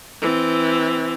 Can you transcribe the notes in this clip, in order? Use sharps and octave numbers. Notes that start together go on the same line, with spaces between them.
E3 C4